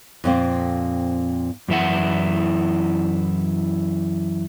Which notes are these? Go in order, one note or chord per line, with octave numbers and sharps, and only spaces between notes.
F2 A#2 C4
F#2 E3 E4 F#5